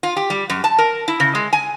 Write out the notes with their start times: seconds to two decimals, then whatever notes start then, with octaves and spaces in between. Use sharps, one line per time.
0.03 F4
0.16 G4
0.30 G3
0.50 F#2
0.64 A5
0.78 A#4
1.08 E4
1.20 C#3
1.35 G#3
1.53 G#5